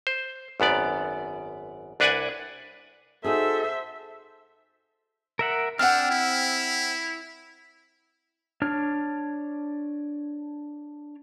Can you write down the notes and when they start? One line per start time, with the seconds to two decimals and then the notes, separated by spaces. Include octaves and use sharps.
0.07 C5
0.60 G#1 F#2 B3 D5
2.00 C2 D4 B4 D5 F#5 G#5
3.24 D#4 F#4 G#4 A4 C5 E5
5.39 A#4 E5 F#5
5.79 C4 D4 F#5 F6
6.10 E4
8.62 D4 C#5 F6